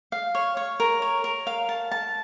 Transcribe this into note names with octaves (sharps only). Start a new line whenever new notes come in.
F5
C#5
C#5
A#4
C#5
A#4
F5
A5
A5